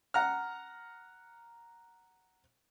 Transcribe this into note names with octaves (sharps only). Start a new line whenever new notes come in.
F#5 A#5 F6